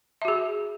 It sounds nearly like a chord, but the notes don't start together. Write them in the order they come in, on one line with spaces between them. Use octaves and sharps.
E5 F#4 G#4